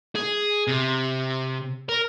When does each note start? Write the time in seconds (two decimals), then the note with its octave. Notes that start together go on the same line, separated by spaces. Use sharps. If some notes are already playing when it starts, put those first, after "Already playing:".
0.15 G#4
0.67 C3
1.89 A#4